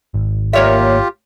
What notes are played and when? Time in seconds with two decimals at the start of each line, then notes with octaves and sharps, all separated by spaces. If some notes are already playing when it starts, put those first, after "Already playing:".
0.14 G#1
0.53 A#3 F4 G4 C#5 E5